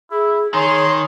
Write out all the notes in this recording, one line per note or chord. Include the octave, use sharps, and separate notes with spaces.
E4 G#4
D#3 G#4 C#5 C6